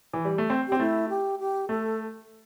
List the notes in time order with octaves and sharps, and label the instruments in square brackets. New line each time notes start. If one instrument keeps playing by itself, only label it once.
[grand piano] E3
G3
A3
C4
[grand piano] C4 [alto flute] G4
[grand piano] A3 [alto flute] E4
[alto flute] G4
G4
[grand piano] A3 [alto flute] A4